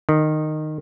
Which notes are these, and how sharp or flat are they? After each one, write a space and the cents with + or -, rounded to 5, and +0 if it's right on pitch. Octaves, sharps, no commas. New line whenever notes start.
D#3 -15